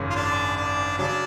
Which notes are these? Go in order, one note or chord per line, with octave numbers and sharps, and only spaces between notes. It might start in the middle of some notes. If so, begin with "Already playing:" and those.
Already playing: G#1 F#2 C#3 G#3 C#4
F4
D4
D4
C#3 F#3 C#4 D4